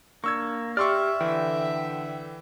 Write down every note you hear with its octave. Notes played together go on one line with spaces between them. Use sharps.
A#3 D4 C#6 E6 G#6
G4 D5 E5 C6 C#6 E6 F6
D3 E3 G5